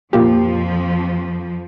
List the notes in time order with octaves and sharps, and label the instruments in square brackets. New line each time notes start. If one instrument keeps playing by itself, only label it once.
[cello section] F2 F3 [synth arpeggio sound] A#2 A#3 G4